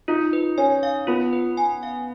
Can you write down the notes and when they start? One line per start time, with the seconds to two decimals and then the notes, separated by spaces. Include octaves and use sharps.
0.08 D#4 F4
0.33 B4
0.58 C#4 G#5
0.83 F5
1.07 B3 F4
1.33 B4
1.57 G#5
1.83 F5